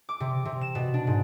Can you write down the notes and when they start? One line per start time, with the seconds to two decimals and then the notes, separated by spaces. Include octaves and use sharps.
0.09 D6
0.20 C3
0.45 C3
0.61 E7
0.75 B2
0.94 D4
1.07 G#2